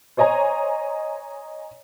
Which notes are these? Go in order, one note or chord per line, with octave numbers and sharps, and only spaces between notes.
C5 C#5 D#5 G#5 A#5